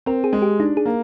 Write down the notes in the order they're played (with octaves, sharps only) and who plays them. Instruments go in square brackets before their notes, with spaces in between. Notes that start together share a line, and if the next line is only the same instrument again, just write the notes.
[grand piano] C4 [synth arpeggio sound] A#4
[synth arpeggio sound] G#4
[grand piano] G#3
[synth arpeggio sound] G4
[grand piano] D4 [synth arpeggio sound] D#4
[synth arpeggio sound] G#4
[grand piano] A#3